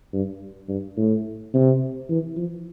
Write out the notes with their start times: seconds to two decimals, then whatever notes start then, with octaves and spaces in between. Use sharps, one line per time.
0.13 G2
0.69 G2
0.97 A2
1.54 C3
2.10 E3
2.37 F3